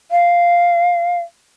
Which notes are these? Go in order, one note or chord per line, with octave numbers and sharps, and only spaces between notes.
F5